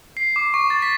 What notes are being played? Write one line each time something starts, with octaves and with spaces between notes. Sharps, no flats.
C7
D6
C#6
A6
B6